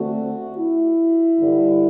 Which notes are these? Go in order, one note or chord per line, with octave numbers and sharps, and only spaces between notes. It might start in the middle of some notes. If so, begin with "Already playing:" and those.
Already playing: D2 D3 A3 C4 F#4
E4
G2 D3 G3